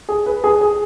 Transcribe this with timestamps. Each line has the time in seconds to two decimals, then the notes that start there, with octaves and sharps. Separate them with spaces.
0.09 G#4
0.26 B4
0.44 G#4
0.61 G#4